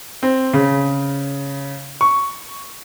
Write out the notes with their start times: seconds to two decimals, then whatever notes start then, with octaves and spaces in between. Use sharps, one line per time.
0.23 C4
0.54 C#3
2.01 C#6